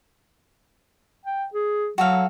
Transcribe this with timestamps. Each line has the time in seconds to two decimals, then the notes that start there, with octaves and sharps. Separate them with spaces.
1.26 G5
1.54 G#4
1.98 F#3 F#4 A4 F5